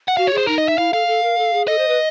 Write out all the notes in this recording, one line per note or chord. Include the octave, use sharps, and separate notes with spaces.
F#5
F#4 F5
C#5
G#4 C5
D#4 A#4
D#5
E5
E4 F5
A4 F5
A4
A#4
A4
G#4
A4 D#5
C5
B4